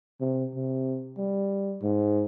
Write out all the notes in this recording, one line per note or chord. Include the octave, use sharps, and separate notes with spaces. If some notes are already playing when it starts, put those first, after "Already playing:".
C3
C3
G3
G#2